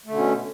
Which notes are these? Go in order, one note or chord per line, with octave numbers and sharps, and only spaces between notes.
B2 D3 A3 C#4